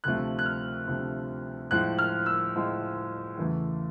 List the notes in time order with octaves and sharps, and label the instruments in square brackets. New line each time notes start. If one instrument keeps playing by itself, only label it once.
[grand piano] D2 C3 F3 A3 F#6
F#6
F6
D2 C3 F3 A3
A2 F3 G#3 F#6
F6
E6
A2 F3 G#3
E2 C#3 E3 A3